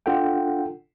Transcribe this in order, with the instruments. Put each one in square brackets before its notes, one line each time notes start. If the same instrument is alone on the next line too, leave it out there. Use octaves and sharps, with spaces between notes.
[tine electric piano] D4 F4 A4 F#5 G5